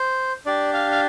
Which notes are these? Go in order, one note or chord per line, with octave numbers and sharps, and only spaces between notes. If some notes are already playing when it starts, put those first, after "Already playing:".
Already playing: C5
D4 G4 D5
F5
F5